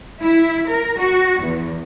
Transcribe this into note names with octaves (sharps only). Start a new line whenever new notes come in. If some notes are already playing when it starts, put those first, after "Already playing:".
E4
A#4
F#4
E2